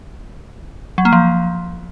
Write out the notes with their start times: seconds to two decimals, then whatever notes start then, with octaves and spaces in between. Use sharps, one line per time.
0.98 F#3
1.05 A#3
1.12 F3